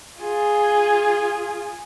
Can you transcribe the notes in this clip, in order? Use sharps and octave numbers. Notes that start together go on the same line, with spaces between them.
F4 G#4